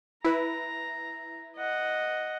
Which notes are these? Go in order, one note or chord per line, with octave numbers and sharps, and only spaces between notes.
E4 B4 A#5
D#5 F#5